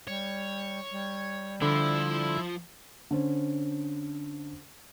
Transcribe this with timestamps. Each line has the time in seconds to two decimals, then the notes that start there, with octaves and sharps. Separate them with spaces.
0.08 G3 C#5
0.91 G3
1.62 D3 F3 E4
3.11 D3 C#4 C5